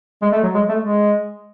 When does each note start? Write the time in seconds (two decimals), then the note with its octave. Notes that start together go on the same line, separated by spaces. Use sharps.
0.22 G#3
0.32 A3
0.43 F#3
0.54 G#3
0.69 A3
0.82 G#3